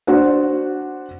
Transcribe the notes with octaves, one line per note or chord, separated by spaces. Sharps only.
D4 F#4 C5 D5 F#5